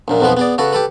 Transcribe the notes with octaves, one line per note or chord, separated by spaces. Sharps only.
A#1 F#2 A#2
B1 F2 B2 F3 B3 B4
B3 G#4 D5
C#3 F#4 A4 B4
G4 A4 B4